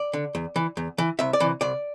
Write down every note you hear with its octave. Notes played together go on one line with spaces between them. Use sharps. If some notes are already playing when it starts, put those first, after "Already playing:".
Already playing: D5
D3
E2
E3
E2
E3
C2 E5
D5
C3 E3
C2 D5